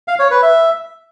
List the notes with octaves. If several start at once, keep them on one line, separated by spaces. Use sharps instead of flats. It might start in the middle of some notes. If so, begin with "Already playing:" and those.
F5
C#5
B4
E5